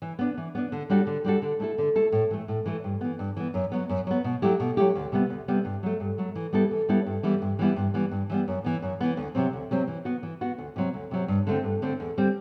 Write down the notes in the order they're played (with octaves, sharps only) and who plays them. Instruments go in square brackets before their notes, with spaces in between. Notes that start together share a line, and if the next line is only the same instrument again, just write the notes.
[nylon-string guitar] E3
B3 D4
E3
B3 D4
D3
G3 D4 F#4 A4
D3
G3 D4 F#4 A4
D3
A3 E4 A4
D3
A3 E4 A4
A2
E3 A3
A2
E3 A3
G2
E3 B3
G2
E3 B3
F#2
F#3 B3
F#2
F#3 B3
B2
F#3 A3 E4 G4
B2
F#3 A3 E4 G4
D2
C3 G3 B3
D2
C3 G3 B3
G2
F#3 A3
G2
F#3 A3
E3
G3 B3 E4 A4
E3
G3 B3 E4 A4
G2
E3 G3 B3 E4
G2
E3 G3 B3 E4
G2
E3 G3 B3
G2
E3 G3 B3
F#2
E3 B3
F#2
E3 B3
D2
C3 F#3 C4
D2
C3 F#3 C4
E3
B3 F#4
E3
B3 F#4
D2
C3 F#3 C4
D2
C3 F#3 C4
G2
D3 A3 C4
G2
D3 A3 C4
E2
D3 G3 C4